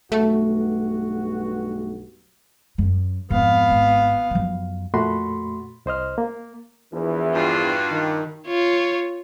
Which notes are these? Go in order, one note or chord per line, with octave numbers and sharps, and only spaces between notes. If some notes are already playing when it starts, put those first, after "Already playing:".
B1 G2 A3 F#4
F#2
F2 G#2 B3 F5
G#1
F#2 F3
F2 A#2 A3 F#4 B5 C6
C2 C5 D#5 F6
A#3
A#1 E2 E3
G2 F4 F#4
D#3
F4 C#5